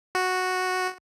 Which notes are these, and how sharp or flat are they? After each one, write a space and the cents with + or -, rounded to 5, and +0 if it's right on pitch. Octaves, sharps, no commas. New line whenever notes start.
F#4 -5